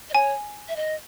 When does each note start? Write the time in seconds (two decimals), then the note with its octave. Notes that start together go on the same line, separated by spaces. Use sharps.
0.10 D#5
0.14 C#5 G#5
0.68 E5
0.76 D#5